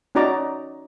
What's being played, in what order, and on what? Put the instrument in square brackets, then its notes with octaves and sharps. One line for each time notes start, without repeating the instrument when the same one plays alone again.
[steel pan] C#4 D#4 F#4 D5 A#5 D6